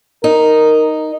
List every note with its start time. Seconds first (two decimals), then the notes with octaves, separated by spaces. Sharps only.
0.24 D#4 A#4